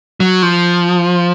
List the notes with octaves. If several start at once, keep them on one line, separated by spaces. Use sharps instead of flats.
F#3
F3